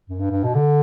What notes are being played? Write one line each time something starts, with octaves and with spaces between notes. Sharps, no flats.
F#2
G2
G2
B2
D3